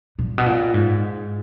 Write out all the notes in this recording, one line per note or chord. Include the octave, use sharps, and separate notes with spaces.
A#2
B2
A#2
G#2